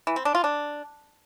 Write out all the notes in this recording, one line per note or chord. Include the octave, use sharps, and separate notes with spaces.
E3
C4
D4
F4
D4